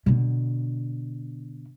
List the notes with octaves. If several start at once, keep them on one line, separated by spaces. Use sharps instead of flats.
B2 D3